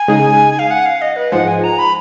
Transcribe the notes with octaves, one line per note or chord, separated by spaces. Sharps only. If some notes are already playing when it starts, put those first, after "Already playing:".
Already playing: G#5
C#3 G#3 D#4 G#4
F5
F#5
F5
D#5
B4
G#2 F3 G#3 F#5
G#5
A#5
B5